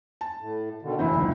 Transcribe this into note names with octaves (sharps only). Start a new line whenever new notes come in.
A5
A2
B2 D3 D#3
F1 E3 C4 E4
F#1 C#2 D#3